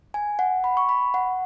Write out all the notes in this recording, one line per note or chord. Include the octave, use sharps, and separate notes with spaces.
G#5
F#5
B5
C#6
B5
F#5